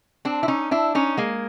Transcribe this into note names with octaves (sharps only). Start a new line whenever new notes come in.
C4 D4
E4
C#4 D#4
D4 E4
C#4 D#4
G#3 A#3